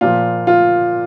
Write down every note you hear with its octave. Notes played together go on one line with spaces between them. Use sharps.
A#2 F3 F4
F4